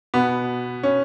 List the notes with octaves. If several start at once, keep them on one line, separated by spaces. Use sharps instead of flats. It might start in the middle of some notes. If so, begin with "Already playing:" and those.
B2 B3
C#4